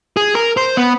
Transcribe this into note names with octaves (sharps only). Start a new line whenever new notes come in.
G#4
A#4
C5
B3